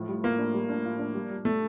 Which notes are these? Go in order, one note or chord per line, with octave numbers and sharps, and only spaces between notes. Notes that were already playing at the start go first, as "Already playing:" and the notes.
Already playing: A2 F3
G3
A#3 F4
D4
G3
D4
F4
D4
G3
G3
A3